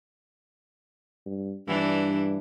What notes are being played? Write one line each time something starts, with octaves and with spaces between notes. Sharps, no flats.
G2
G2 E3 D4